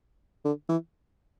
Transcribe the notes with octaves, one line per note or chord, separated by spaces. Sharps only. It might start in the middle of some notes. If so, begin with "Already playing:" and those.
D3
E3